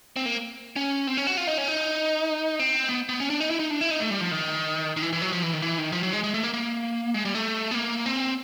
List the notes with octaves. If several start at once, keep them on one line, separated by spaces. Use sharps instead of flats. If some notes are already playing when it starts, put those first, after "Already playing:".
C4
A#3
C#4
C4
C#4
F#4
F4
D#4
C#4
D#4
C4
B3
B3
C#4
D4
D#4
E4
D#4
D4
E4
D#4
A3
G3
F3
D#3
D#3
E3
E3
F#3
F3
E3
D#3
E3
D#3
F3
F#3
G#3
G#3
A3
A#3
A#3
G#3
G3
A3
B3
A#3
C4